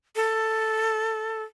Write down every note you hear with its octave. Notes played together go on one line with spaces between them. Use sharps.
A4